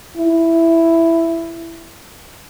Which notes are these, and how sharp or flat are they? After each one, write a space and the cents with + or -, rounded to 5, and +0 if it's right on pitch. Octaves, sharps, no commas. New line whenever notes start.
E4 +5